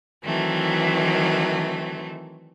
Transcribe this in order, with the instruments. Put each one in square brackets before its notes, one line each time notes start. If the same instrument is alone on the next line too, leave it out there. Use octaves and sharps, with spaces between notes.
[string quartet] D#3 E3 F#3 A3 C4